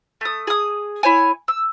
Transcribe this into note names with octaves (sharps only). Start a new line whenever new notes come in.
A3 D#6
G#4 D#6
E4 C#5 G#5
E6